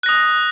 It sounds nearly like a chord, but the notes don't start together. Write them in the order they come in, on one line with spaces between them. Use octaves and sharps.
F#6 A#6 D#6